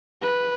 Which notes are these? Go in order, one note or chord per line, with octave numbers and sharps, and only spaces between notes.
B4